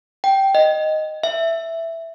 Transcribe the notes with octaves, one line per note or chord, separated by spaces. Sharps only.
G5
D#5
E5